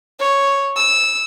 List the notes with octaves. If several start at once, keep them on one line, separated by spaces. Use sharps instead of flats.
C#5
E6